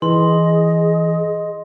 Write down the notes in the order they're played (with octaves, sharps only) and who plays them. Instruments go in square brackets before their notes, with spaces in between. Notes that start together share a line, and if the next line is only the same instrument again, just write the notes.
[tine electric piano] E3 [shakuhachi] G#4 [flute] D#5 [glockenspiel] C6